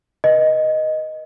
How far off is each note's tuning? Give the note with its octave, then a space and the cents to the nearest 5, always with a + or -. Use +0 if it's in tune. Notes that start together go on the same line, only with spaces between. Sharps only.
B4 -35 D#5 +0